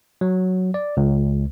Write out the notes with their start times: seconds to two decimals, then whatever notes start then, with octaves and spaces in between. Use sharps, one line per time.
0.21 F#3
0.74 D5
0.97 C#2